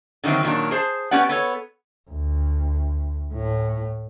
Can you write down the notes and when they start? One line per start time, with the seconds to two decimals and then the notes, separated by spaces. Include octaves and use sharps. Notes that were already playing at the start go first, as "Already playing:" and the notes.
0.24 D3 D#3 F#3 A3 C4
0.43 A#2 D#3 F#3 D4
0.71 G#4 C5 A5
1.11 B3 C#4 G4 D5 F#5
1.29 B3 A4 C#5
2.10 D2
3.34 A2